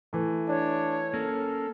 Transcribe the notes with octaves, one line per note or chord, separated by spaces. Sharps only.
E3 A3
D4 C#5
A#3 C#4 A4